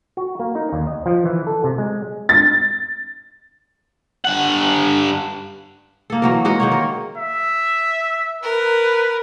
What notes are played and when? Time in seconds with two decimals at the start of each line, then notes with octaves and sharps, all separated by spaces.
0.17 F#4
0.40 A#3
0.55 D#4
0.72 D#2
0.87 D#5
1.06 F3
1.25 E3
1.47 A4
1.64 C3
1.78 G#3
2.29 A6
4.25 G2 F#5
6.10 A#3 A4
6.22 E3 F#3 A#4
6.45 G#3 C#4 F#4 A#4
6.60 D#3 A#3 C#5
6.72 A#4
7.17 E5
8.43 A#4 B4